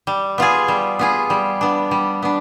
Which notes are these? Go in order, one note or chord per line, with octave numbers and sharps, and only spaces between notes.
G3
B3 F4 G#4
G3
B3 F4 G#4
G3
B3 D4
G3
B3 D4